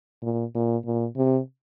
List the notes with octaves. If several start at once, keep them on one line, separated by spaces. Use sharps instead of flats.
A#2
A#2
A#2
C3